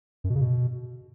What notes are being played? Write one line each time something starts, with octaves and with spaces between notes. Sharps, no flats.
F#2
B2
C#3
B2